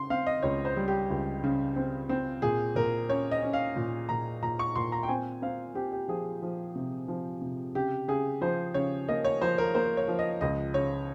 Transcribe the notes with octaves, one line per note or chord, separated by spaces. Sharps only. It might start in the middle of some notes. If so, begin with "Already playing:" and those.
Already playing: C#3 C6
C4 F5
D#5
C#2 C#5
C5
G3
G4
C#2
C#3
C4
C4
A#2 G#4
A#2 A#4
C#4 C#5
D#5
C#4
F5
A#2
A#2 A#5
A#2 A#5
C#6
A#2 C6
A#5
G5
C4 G#5
C4 F5
C4 G4
G4
F3 G#4
F3
C3
F3
C3
C#3 G4
C#3 G#4
F3 C5
C#3 C#5
A#3 D#5
C#5
F3 C5
A#4
A#3 C5
C#5
F3
D#5
C#2 D#5
C#3 C#5